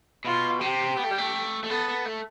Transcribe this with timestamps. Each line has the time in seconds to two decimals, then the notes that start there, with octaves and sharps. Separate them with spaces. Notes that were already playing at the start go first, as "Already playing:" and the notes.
0.25 B2 F4
0.61 C3 G4
0.97 B3
1.04 A3
1.11 G3
1.18 A3
1.64 A3
1.69 B3 A4
1.88 B3
2.06 A3